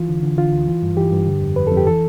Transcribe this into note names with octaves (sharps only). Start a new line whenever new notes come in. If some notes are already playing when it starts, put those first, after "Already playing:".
Already playing: E3 F4
D3
D3
D3 F4
D2
E3
G2
E3 G4
G2
D3
F2
F2 B4
F2 A4
G4
E3 A4